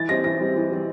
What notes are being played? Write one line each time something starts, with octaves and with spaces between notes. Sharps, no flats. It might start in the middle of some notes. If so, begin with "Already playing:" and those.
Already playing: E3 A6
G3 C4 A#6
E3 A#6
G3 C4
E3
G3 C4